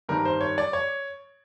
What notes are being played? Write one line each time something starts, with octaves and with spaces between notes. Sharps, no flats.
G2 D#3 G3 C4 A#4
C5
C#5
D5
C#5